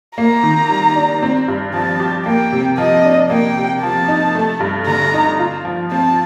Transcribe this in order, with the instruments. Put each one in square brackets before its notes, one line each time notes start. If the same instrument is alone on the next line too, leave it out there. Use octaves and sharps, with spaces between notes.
[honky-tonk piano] A#3 [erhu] A#5
[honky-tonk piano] D#3
G3
D4
C4
G2
[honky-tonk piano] F3 [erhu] A5
[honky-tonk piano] G4
[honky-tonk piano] A#3 [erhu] G5
[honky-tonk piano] C3
[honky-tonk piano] F3 [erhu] D#5
[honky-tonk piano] D4
[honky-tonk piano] A#3 [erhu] G5
[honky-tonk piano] C3
[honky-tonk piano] F3 [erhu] A5
[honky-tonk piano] D#4
A3
G2
[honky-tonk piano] D3 [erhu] A#5
[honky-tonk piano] D#4
F4
F3
[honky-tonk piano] C4 [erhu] A5